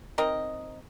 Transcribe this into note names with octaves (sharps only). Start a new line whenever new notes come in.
C4 D#4 A#4 D#5